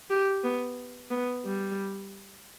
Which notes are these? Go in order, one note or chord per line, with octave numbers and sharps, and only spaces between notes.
G4
B3
B3
G3